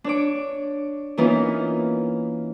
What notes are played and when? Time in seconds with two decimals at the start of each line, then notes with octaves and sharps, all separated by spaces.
0.04 D4 C#5 D6
1.17 E3 A#3 B3 C#4 D#4 F4